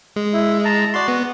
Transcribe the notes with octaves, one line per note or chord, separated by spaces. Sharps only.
G#3
E4
A5 A#5
F#4 D5 C6
B3